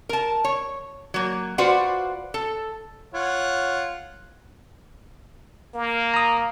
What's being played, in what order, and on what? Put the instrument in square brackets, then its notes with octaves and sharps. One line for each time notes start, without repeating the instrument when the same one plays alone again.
[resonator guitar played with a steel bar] A#4 A5
C#5
F#3 A#3
F4 F#4 B4 C5 D5 F#5
A4
[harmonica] F4 C#5 F#5
[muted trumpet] A#3
[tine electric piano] A#5 D#6